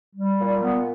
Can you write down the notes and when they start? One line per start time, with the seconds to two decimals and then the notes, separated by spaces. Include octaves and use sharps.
0.16 G3
0.39 A#2
0.63 B3